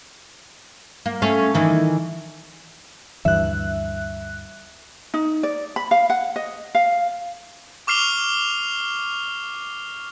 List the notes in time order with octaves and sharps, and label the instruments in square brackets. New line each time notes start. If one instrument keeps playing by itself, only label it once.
[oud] A#3
A3 C#4 F5
D#3 E3
[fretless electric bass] D2 G2 E3 [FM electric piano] E5 F#6
[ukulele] D#4
D5
B5
F5
F#5
D#5
F5
[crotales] C#6 D6 F6 C7 F7 G7